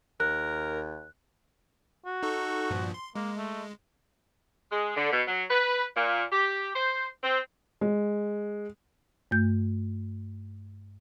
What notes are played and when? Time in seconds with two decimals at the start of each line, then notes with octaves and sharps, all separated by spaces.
0.20 D#2 A#4 F#6
2.06 F#4
2.23 D#4 A4 C#6
2.70 G2 A#2 F3
2.94 C6
3.15 G#3 A#3
3.37 A3
4.72 G#3
4.96 D3
5.10 B2
5.28 F#3
5.50 B4
5.96 A#2
6.31 G4
6.75 C5
7.23 C4
7.81 G#3
9.31 G2 A3 G6